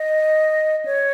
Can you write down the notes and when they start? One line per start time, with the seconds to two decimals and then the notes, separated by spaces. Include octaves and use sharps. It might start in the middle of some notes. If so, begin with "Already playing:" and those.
Already playing: D#5
0.86 C#5